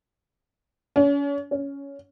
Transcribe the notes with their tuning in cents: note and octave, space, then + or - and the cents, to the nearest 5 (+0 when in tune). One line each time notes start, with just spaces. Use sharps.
C#4 +35
C#4 +10